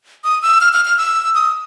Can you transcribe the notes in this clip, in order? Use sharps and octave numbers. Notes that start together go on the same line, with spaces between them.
D#6
E6
F6
F6
F6
E6
D#6